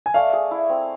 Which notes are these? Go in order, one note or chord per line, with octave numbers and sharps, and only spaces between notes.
G#5
A3 D5 F5
G#4
E4
C4